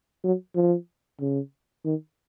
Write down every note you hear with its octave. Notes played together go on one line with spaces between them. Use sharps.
F#3
F3
C#3
D#3